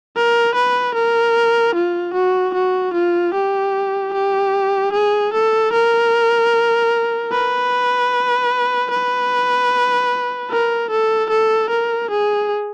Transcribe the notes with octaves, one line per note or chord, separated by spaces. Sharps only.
A#4
B4
A#4
F4
F#4
F#4
F4
G4
G4
G#4
A4
A#4
B4
B4
A#4
A4
A4
A#4
G#4